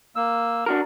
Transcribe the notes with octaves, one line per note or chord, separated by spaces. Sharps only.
A#3 E6
D4 F#4 A#4